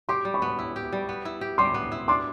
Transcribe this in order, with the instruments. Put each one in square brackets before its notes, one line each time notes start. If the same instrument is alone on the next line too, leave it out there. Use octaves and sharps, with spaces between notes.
[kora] G4 [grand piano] C6 D6
[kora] G3
[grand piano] B5 C#6
[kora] B3
E4
G4
G3
B3
E4
G4
[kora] G3 [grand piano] C6 D6
[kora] B3
E4
[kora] D4 [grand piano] C6 D6